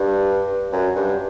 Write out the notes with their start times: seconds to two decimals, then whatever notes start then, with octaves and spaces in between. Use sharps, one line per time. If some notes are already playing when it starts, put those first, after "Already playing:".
Already playing: G2
0.72 F#2
0.95 G2